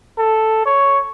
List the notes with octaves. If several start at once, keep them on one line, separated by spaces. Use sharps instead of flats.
A4
C#5